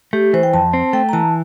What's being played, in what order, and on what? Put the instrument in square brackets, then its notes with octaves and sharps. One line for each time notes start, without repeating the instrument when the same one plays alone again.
[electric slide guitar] A3 [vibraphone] G4
[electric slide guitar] E3 [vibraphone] C5
[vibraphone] G5
[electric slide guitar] F2 [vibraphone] A5
[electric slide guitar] C4
[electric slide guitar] A3 [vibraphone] G5
[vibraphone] A#5
[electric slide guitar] E3 [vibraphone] A5